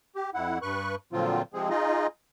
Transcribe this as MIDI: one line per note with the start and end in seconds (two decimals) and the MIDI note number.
0.16 0.30 67
0.34 0.59 41
0.34 0.59 64
0.34 0.59 78
0.62 0.95 43
0.62 0.95 71
0.62 0.95 85
0.62 0.95 90
1.13 1.42 46
1.13 1.42 50
1.13 1.42 53
1.13 1.42 54
1.13 1.42 60
1.13 1.42 65
1.54 1.69 48
1.54 1.69 53
1.54 1.69 56
1.54 1.69 60
1.54 1.69 68
1.70 2.07 63
1.70 2.07 65
1.70 2.07 68
1.70 2.07 75